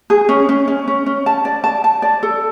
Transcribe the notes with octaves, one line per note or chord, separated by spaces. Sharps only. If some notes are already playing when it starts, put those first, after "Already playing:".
G#4
C#4
C#4
C#4
C#4
C#4
A5
D5
A5
A5
D5
A4